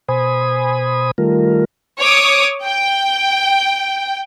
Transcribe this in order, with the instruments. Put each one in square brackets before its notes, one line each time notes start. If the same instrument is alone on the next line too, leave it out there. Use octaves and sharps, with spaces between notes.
[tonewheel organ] B2 C5 G#5 B5 D#6
D#3 G3 A3 F4 A#4
[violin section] C#5 D6 D#6
G5